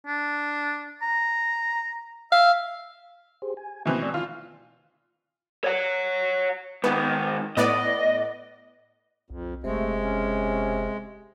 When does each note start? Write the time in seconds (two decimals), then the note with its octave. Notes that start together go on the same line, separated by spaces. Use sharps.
0.07 D4
1.02 A#5
2.32 E5 F5
3.42 G4 G#4 C5
3.57 G#5
3.85 B2 E3 A#3 C4 E5
4.03 A3 D5 E6
4.14 D#3 E4 F4
5.64 C#5 F#5
6.84 G#2 D#3 B3
7.57 A2 B3 D5 D#5
9.30 B1 F2
9.64 F#1 C3 G#3 A3
10.01 C#4